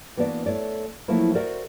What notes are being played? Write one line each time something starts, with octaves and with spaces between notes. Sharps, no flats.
E3 A#3 B3 D4 F#4 D5
A3 C#5 D5
F3 F#3 A3 A#3 E4 F4
F#4 A#4 C5 D5 E5 F#5